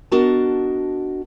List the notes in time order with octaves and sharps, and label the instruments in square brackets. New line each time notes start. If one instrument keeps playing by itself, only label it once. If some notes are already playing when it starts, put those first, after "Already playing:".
[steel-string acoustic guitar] B3 D4 F#4 A#4 D#5 A5